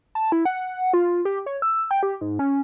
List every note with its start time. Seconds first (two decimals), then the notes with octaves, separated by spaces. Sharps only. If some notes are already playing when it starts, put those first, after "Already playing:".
0.15 A5
0.32 E4
0.45 F#5
0.93 F4
1.25 G4
1.46 C#5
1.62 E6
1.91 G5
2.03 G4
2.21 G#2
2.39 C#4